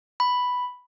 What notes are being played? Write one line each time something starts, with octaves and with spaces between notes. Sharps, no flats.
B5